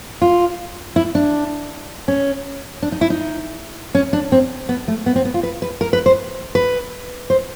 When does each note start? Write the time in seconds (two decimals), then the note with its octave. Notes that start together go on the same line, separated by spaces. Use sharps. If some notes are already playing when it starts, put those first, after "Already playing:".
0.22 F4
0.96 E4
1.15 D4
2.08 C#4
2.83 D4
2.92 D#4
3.01 E4
3.10 D#4
3.95 C#4
4.13 D4
4.32 C4
4.69 B3
4.88 A3
5.06 B3
5.16 C4
5.25 B3
5.34 F4
5.43 B4
5.62 B4
5.81 A#4
5.93 B4
6.06 C5
6.55 B4
7.30 C5